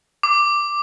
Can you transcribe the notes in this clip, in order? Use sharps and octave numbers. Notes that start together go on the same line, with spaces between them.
D6